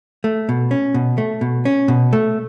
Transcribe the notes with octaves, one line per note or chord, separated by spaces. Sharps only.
A3
B2
C#4
B2
A3
B2
C#4
B2
A3